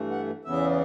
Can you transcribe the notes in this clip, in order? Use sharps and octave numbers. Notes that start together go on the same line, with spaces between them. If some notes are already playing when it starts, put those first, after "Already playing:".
Already playing: G2 E3 A3
F#5
E2 C#3 E3 B3 E5